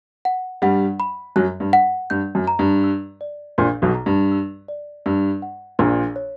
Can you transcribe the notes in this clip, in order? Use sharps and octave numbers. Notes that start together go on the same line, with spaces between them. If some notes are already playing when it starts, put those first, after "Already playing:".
F#5
G2 G3 F#5
B5
F#2 F#3 F#6
G2
F#5
G2 G6
F#2
A#5
G2
E6
D5
A#1 A#2 G6
B1 B2
A#5
G2
E6
D5
G2 E6
F#5
A#1 A#2 A#5
C#5